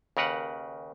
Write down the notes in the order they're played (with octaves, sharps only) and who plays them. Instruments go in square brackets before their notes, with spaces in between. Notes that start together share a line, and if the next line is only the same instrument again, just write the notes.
[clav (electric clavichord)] D#2 C#3 A#4 B4 F#5